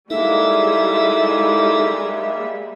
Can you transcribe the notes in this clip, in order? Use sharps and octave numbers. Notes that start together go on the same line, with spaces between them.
G3 G#3 A#3 D#4 E4 A4 E5